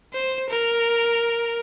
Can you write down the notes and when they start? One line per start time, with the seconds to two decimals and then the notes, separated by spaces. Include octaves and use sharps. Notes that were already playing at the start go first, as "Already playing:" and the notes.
0.14 C5
0.50 A#4